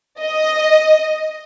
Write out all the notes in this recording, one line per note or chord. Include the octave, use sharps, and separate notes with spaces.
D#5